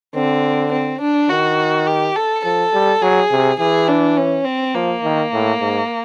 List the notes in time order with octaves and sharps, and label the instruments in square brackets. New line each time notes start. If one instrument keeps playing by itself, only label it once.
[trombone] D3 [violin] C4
[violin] C4
D4
[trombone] D#3 [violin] F#4
[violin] G4
A4
[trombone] F3 [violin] A4
[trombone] G3
[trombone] F#3 [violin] G#4
[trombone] C3
[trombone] E3 [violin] G#4
[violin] D4
C#4
C4
[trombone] F3 [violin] A#3
[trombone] D#3
A2
G#2